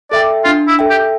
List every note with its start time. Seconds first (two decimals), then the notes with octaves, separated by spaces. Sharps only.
0.12 A4 D5 E5 G5
0.45 D4 F4
0.68 E4
0.79 A4 E5 G5
0.90 G4